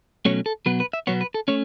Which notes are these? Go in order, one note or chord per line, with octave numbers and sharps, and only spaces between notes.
B2 F#3 A3 C#4 C#5
A4
B2 F#3 B3 B4
B4
E5
B2 F#3 B3 C#5
B4
A4
A3 C#4 C#5